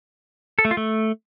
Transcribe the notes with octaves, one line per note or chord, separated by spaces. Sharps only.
A4
A3
F4
A3